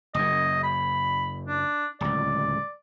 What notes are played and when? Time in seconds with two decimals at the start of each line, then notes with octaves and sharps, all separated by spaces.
0.14 F#1 F#2 D#5
0.63 B5
1.47 D4
2.01 D1 C#2 D5